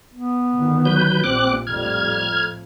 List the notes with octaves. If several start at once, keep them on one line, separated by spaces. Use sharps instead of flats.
B3
G1 D#3
F#3 B4 G6
A#1 G3 C4 D6 F#6
F2 A2 G3 F6 G#6